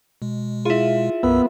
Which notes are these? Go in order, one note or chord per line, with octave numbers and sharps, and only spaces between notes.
B2 G#3
E4 F4 G#4 E5
B1 F#2 A#3 B3 E6